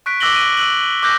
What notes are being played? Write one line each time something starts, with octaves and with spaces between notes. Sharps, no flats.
C#6 F#6 B6 D7
D6 E6 F#6 A#6 F#7 G7
D7 D#7
E6 F#6 F#7
D6 E6 F#6 G6 A#6